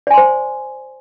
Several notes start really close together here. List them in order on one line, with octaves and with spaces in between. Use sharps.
D5 G#5 C6 C5